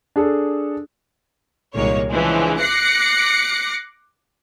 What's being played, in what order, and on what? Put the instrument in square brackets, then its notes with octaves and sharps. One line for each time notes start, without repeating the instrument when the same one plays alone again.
[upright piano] D4 G#4 A4
[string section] C2 A#2 D#3 G#3 A#3 C#5
C#3 E3 F3 G#3 D4
D6 F#6 A#6 C7 C#7